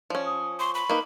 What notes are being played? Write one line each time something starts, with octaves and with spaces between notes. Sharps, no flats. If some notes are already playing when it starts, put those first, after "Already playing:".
F3 C#4 D5
D#6
C6 C#6
B5
A#3 D#4 B4